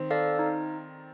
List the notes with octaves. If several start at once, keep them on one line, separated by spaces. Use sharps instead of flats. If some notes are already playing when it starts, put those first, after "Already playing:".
Already playing: D#3 C4
A4 D5 F5
D#4